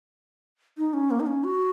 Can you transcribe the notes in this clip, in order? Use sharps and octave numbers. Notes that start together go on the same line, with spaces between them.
D#4
C#4
A#3
D#4
C#4
F#4